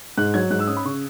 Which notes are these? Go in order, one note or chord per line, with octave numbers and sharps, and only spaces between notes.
G#2 F#6
F#3 G#6
G#2 F#6
E6
C#4 D#6
B5
C#3 C#6